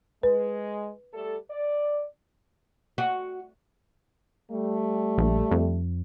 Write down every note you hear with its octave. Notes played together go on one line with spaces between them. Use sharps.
G#3 B4
G3 A3 A4
D5
F#4
G3 A3
A#1
F2